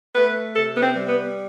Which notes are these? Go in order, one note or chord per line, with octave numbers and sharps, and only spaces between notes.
A3 B4
C3 A4
B3
C4
G3
B3